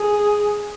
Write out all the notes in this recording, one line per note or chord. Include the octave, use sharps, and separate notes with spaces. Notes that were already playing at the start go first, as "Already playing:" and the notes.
Already playing: G#4